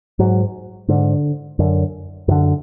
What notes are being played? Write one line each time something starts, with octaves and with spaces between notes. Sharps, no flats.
G#2 F#3
G#2 D3
F#2 D3
F#2 D3 D#3